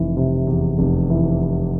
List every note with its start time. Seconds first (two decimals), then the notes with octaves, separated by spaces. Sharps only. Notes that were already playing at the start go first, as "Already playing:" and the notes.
Already playing: F1 E3
0.17 C3
0.47 E2
0.79 F1
1.10 E3